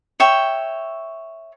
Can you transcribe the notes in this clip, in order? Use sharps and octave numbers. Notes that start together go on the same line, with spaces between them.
C#5 E5 G5